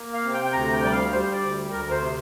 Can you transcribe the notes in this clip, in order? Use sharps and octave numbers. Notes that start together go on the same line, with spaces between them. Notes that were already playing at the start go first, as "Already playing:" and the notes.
Already playing: A#3
F5
C3
G5
G5
D2 A#5
G5
G3 D5
F5
G3 C5
D5
D2
D2 A#4
C5
C3